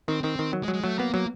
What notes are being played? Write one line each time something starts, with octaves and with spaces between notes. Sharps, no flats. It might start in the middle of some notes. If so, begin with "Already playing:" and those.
D#3 C4
D#3 C4
D#3
F#3
G#3
F#3
G#3
F#3 A3
A#3 B3
F#3 A#3